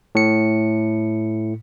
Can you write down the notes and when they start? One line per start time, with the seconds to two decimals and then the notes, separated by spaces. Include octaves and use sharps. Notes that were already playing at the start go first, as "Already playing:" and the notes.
0.15 A2 C#7